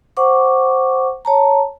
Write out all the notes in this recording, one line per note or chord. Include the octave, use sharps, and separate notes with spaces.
C5 F#5 C#6 D6
C#5 A5 A#5